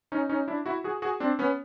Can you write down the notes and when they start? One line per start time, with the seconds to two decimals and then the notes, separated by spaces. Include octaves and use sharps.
0.12 C#4 D#4
0.29 C#4 D#4
0.48 D4 E4
0.66 E4 F#4
0.84 F#4 G#4
1.02 F#4 G#4
1.20 C4 D4
1.39 B3 C#4